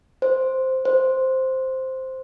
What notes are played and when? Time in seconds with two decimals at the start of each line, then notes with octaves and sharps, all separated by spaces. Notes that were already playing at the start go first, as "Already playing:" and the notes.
0.22 C5
0.85 C5